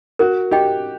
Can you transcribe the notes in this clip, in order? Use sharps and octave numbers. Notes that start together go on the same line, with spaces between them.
F#4 A#4
G4 D#5 G5